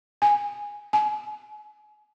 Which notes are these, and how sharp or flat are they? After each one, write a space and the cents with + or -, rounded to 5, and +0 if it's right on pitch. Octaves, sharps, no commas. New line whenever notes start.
G#5 -5
G#5 +30